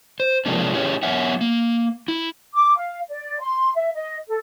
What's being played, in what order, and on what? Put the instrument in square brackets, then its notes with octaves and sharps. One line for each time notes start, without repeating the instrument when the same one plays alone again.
[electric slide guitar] C5
C3 F3 G#3 A#3 C#4 D4
C#4 E4 G4 G#4 C#5
F#3 B3 C#5 E5 F#5
A#3
E4
[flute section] D6
F5
D5
C6
E5
D#5
A4